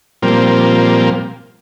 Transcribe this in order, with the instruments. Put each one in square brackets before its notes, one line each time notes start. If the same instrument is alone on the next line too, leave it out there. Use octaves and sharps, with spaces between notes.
[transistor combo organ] A#2 F3 G3 A#3 C4